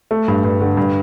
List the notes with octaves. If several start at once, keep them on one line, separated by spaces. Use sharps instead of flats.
A3
G2
G2
D3
G2